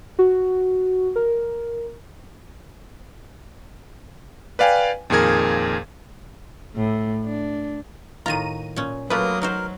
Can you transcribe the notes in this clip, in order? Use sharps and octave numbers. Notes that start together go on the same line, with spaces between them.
F#4
A#4
B4 D5 F5 G5 G#5
F2 A#2 D#3 G#4 A#4 G#6
A2
D4
A2 D#3 F4 A#5 D#7
A#2 C#4
F#3 A3 A#3 F4 A#4 B4 D#6
D#4 F#4 A#4 C5